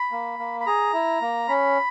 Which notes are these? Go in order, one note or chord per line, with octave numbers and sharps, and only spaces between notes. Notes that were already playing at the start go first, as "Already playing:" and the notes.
Already playing: B5
A#3
A#3
B5
G#4 A#5
E4
A#3
C#4 B5